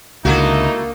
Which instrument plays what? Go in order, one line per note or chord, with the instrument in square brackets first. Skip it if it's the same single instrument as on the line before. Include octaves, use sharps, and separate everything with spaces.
[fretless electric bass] C#2 D3 [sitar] A3 E4 F#4 [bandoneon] A#3 [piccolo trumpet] D#4